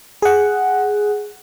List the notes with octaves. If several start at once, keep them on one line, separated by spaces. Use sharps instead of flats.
G#4 F#5